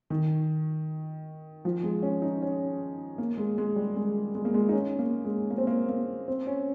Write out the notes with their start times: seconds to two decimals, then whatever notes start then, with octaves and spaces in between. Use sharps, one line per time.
0.10 D#3
1.65 F3
1.83 G#3
2.03 C#4
2.22 D#4
2.42 C#4
3.18 A#3
3.38 G#3
3.58 G#3
3.76 G3
3.96 G#3
4.35 G#3
4.45 A#3
4.54 G#3
4.69 D#4
4.73 C#4
4.99 A#3
5.25 G#3
5.50 A#3
5.58 C4
5.67 A#3
5.89 A#3
6.28 C4
6.47 C#4